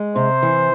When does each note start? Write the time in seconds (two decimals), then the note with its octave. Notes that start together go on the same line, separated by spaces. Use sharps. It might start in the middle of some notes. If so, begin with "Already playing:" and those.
Already playing: G#3
0.16 C3 C5
0.43 E3